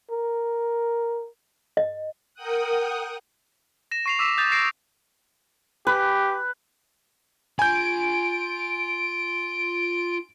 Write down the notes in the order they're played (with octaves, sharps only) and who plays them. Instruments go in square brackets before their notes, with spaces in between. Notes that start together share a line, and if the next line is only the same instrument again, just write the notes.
[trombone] A#4
[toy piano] D#5
[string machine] A#4 F#5 G5 D#6 F#6
[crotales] A#6 E7
C#6 C7 F7
D6 E6 B6 E7
D#6 G6 A6
A#6 C7 D7 E7
[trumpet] G4 [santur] B4
[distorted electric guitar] F4 B5 [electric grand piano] G#5 G6 [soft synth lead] D7